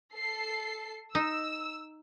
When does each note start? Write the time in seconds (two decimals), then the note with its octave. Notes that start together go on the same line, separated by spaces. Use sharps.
0.13 A4 C7
1.15 D#4 E6